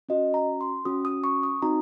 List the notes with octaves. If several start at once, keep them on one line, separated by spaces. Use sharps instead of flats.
C#4 F#4 D#5
A#5
C6
C#4 F#4 D#6
D#6
C#6
D#6
C4 D#4 F#4 A#5